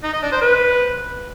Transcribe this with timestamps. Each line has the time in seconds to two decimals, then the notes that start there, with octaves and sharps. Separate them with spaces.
0.04 D#4
0.13 D#5
0.22 D4
0.32 C5
0.41 B4